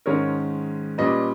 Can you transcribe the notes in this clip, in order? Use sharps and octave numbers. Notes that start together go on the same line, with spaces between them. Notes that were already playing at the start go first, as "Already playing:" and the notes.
G#2 D#3 G#3 C#4 A#4 C#5
A#2 G3 C#4 B4 D#5